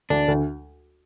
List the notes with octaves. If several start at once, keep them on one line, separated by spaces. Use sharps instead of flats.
D2 D4
D2